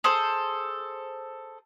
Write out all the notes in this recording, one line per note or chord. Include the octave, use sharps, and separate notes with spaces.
G#4 A4 C5